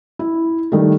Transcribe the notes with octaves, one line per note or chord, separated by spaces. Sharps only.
E4
D#3 G3 A3